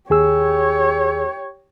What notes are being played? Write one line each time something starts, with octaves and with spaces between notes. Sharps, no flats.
D#2 G4 G#4 C#5 E6